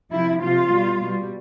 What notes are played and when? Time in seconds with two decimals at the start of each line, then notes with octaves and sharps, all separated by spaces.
0.11 C3 F3 E4
0.41 C3 F3 F4
0.71 B2 G3
1.01 B2 G3